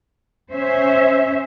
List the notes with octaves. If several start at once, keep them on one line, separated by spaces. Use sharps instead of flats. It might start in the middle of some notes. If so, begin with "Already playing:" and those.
C#4 C5 E5